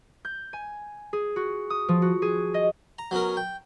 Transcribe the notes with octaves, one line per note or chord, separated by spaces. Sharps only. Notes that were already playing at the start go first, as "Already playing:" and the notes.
G6
G#5
G#4
F#4
D#6
F3
F#4
G#4
D#5
A#5
F#3 B3 C#4 A#4
G5